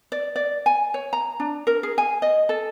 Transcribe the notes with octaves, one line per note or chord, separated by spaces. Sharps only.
D5
D5
G#5
C#5
A#5
D4
A#4
G#4
G#5
D#5
A4